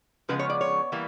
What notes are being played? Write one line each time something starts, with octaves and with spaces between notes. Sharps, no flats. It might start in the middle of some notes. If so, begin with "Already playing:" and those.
C#3 F3 G#3 B3 B4
C#5
D5
C#5
E3 G3 A#3